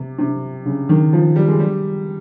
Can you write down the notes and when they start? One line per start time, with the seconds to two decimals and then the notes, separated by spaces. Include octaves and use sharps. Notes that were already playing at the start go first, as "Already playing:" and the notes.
Already playing: C3
0.19 C3
0.66 C#3
0.89 D#3
1.13 F3
1.36 G3
1.48 G#3
1.60 G3